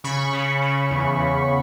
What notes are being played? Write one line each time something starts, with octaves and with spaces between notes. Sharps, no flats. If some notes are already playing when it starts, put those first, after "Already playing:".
C#3 B5 C#6
C#3
C#3
E2
E2